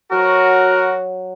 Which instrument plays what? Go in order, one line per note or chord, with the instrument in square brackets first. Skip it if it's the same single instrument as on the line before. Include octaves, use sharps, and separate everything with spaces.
[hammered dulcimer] F#3 [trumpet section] F#4 [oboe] A#4